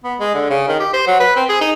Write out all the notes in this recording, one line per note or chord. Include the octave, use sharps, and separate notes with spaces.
B3
G#3
D3
C#3
D#3
G4
C5
F#3
B4
C4
G#4
D#4